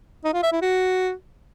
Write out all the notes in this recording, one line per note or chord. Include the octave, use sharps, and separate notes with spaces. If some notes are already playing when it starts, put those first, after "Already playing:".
D#4
F4
E5
E4
F#4